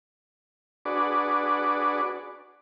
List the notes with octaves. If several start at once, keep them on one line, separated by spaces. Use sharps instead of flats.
D4 F#4 G#4 B4 D5